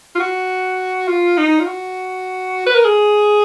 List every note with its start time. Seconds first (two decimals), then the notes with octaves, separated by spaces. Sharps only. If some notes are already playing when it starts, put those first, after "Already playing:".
0.15 F4
0.20 F#4
1.08 F4
1.38 D#4
1.60 F4
1.67 F#4
2.66 B4
2.75 A#4
2.85 G#4